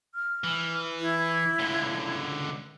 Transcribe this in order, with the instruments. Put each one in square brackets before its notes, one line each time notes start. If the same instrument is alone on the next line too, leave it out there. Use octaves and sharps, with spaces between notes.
[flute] F6
[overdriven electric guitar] E3
[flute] E4
[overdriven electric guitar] C#2 D3